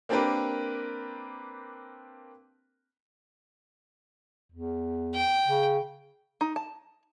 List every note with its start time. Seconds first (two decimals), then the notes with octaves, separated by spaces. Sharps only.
0.09 A#3 C4 D4 G4 A#4 B4
4.52 E2
5.15 G5
5.47 C#3
6.41 D#4
6.56 A5